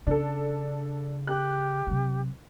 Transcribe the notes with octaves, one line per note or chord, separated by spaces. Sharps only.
C#3 C#4 D4 A4
G4 F#6
C3 F#3